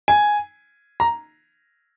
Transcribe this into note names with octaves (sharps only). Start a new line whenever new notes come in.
G#5
A#5